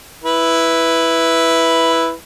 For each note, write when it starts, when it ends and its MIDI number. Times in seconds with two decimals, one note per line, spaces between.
0.24 2.13 64
0.24 2.13 71